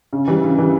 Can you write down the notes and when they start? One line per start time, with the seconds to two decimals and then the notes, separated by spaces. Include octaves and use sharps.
0.13 C#3
0.28 E3 G3
0.44 C#3
0.58 E3 G3